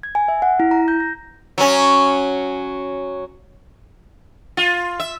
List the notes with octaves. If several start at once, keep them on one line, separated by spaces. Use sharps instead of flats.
G#6
G#5
E5
F#5
E4
A#5
G6
A#6
F#3 C#4
F4
E5